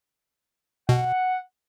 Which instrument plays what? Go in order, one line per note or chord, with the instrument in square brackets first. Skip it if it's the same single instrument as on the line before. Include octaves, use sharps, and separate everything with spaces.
[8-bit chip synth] B2 [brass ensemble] F#5